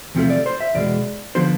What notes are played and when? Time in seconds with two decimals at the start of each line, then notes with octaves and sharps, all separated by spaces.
0.15 E2 C3 F3 A3
0.30 D5
0.46 C5
0.61 E5
0.75 E2 B2 G#3 D5
1.35 D3 F3 B3 C5